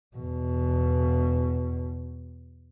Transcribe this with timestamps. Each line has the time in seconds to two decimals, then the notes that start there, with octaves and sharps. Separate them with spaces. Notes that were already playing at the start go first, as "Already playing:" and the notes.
0.17 E2 B2